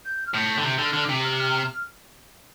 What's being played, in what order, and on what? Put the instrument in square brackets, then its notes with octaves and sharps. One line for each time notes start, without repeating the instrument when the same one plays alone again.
[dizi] G6
F6
[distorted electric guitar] A2 [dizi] G6
[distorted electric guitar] D3
[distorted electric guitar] C3 [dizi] G6
[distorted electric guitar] D3 [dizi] F6
[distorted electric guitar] D3
[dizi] D6
[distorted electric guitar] C3
[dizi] F6
F6
F6